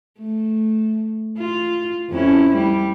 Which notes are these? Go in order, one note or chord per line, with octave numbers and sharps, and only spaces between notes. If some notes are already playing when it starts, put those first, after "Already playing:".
A3
F4
F2 C#4 E4
G3